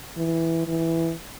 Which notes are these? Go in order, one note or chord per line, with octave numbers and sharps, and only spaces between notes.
E3
E3